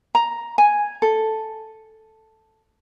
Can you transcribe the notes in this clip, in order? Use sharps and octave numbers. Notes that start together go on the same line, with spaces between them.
A#5
G#5
A4